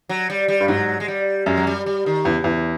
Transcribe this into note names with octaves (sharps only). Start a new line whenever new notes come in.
F#3
G3
G3
G2
G#2 F#3
G#3
G3
F#2 G#3
F#3
G3
G3
D#3
E2 C#3
E2